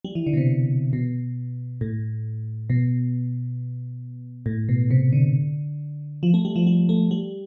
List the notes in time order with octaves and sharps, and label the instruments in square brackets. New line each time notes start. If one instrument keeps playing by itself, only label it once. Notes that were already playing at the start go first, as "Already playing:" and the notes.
[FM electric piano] G3
E3
D3
B2
C3
B2
A2
B2
A2
B2
C3
D3
F3
A3
G3
F3
G3
A3
G3